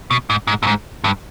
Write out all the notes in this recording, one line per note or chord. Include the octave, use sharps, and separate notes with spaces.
B2
G#2
G#2
G2
G#2
G2